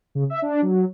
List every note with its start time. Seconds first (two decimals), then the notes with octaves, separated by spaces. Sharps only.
0.15 C#3
0.30 E5
0.42 D4
0.62 F#3